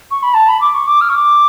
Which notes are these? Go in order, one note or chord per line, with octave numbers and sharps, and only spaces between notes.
C#6
B5
A5
B5
D6
C#6
D6
F6
C#6
D6